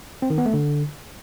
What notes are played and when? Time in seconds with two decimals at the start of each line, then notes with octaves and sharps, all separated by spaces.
0.22 C4
0.30 D#3
0.38 B3
0.46 A3
0.53 D3